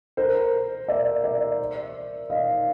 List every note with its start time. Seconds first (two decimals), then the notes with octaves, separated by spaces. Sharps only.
0.17 A#4 C5
0.88 D5 E5
1.24 D5 E5
2.30 D#5 F5